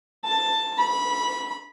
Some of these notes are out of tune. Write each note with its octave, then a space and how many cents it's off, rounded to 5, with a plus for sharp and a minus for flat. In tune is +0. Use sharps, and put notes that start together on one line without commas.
A5 +10
B5 -15